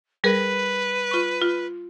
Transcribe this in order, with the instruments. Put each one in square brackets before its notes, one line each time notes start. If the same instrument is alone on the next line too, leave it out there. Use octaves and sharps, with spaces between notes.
[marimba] G3 G#4 A#4 [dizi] B4
[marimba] F4 C#6
F4